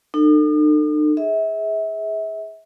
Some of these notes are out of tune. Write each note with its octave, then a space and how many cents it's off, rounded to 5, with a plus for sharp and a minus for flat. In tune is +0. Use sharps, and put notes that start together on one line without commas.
D#4 -45 A4 +30
G#4 +0 E5 -30